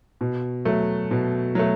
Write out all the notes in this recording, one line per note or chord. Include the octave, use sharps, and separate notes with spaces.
B2
F#3 A3
B2
F#3 A3